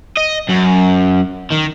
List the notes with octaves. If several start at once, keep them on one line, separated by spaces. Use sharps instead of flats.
D#5
F#2
D#3